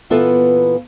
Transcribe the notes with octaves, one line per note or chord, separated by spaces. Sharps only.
A#2 E3 B3 F4 A4 E5